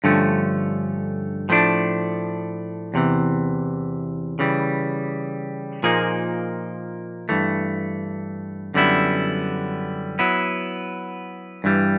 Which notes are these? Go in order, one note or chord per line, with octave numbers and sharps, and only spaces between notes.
G2 D3 F3 A3 C#4
A2 F3 A3 D4
E2 C3 E3
C#3 E3 G3
A#2 F3 A#3 D#4 G#4
G2 E3 A3
F#2 D3 G3 B3 E4
F#3 B3 E4
G2 E3 G3